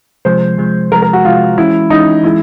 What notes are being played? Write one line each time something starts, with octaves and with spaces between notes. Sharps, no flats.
C3 F3 G#3 C5
C3 F3 G#3
C3 F3 G#3 A#4
A#4
F#4
C3 F3 G#3 F4
E3 G#3 C#4 E4
E3 G#3 C#4 D#4
E3 G#3 E4